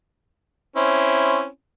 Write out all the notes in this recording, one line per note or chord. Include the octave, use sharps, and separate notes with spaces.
C4 C#4 E4